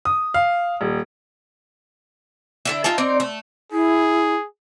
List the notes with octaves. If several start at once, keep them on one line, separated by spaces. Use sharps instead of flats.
D#6
F5
D#1
D3 E4 E5
D#4 F4 E5 A5
C4 D#4 D5
A3
E4 G#4